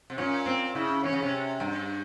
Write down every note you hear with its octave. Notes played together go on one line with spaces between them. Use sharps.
C3
A#2 C#4
C4
C#3 E4
E3 C#4
C#3
C3
G2